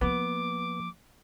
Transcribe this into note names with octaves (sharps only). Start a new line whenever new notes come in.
F3 A#3 B3 D6